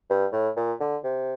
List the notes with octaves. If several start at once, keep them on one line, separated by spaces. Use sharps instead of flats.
G2
A2
A#2
D3
C3